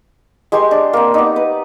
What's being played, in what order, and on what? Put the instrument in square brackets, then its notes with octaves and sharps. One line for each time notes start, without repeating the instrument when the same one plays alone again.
[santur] G#3 G4 C6 C#6
D4
A#3 C4
B3 D#4
B4